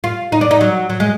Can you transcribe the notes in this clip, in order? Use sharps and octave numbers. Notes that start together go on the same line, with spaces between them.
F4
D#4
D4
D#4
F#3
F#3
G#3